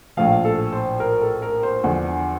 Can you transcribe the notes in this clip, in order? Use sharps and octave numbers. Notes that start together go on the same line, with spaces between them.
A#1 A2 F3 F5
A4
C5
A#4
A4
A#4
C5
E2 D3 F3